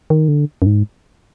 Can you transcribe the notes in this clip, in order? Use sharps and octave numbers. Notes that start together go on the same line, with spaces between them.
D#3
D3
F#2
G#2